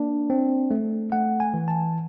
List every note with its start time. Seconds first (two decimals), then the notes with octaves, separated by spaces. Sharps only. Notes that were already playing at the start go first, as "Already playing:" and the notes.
Already playing: A#3 D4
0.30 C4
0.71 A3
1.12 A3 F#5
1.40 G#5
1.54 E3
1.68 A5